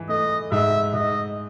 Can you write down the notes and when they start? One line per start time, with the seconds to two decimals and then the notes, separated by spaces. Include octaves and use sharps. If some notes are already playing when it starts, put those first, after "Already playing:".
Already playing: G#2 E3
0.09 A3 D#5
0.51 G#2 E5
0.94 G#2 D#5